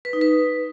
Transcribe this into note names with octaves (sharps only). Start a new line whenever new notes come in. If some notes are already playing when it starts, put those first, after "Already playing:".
B4
D#4
B4